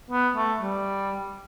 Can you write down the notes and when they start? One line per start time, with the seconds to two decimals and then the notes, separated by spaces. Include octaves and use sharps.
0.11 B3
0.36 A3
0.62 G3